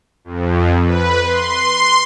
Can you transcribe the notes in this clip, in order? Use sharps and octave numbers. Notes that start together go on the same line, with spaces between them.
F2
B4
C6